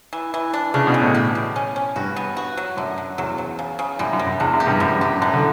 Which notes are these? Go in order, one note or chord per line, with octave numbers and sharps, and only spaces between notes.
E3
E3
D4
C#3 D4
B2
E3
A2
G4
G3
C#4
C#4
G2 F#4
B3
F#4
F#3
F#2 D3
D3
E2 F#3
F#3
C#3
C#3
F#2 G3
F#2
G3
F#2
E2 D4
F#2
G4
G2
F#2 G3
F#2 G4
F#2 D4
D3